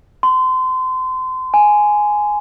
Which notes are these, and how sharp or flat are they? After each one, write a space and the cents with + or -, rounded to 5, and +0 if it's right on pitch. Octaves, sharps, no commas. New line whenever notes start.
C6 -30
G#5 +5